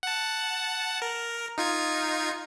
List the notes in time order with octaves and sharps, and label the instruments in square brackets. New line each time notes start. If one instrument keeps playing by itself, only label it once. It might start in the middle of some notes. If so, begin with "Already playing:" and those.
[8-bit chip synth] F#5 A5
A#4
D#4 F4 G#6